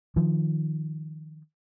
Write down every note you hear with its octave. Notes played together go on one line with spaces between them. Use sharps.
D#3 F3